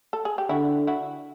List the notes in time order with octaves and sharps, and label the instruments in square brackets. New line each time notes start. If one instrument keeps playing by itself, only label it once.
[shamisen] A4
G#4
G4
[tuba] D3 [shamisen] E4 F#4
[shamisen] E4 F#4